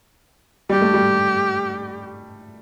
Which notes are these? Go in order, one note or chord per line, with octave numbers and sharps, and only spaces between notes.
G3 G4
A3
G3